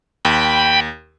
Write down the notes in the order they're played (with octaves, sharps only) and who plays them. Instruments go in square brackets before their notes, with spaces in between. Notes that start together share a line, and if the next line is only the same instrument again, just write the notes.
[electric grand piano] D#2 [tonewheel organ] G5 B5